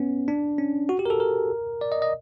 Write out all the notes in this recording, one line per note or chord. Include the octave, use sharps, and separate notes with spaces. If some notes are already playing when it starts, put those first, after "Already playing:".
Already playing: B3 C#4
D4
C#4
F#4
G4
A#4
A4
A#4
D5
D#5
D#5